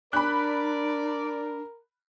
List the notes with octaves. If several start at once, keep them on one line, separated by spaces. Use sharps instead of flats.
D4 A#4 D5 B5 F#6